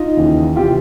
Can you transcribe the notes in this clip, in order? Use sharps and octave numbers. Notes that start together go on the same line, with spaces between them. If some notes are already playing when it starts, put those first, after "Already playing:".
Already playing: D#4 F4
D#2 C#3 E3
C3 E3 F4 G4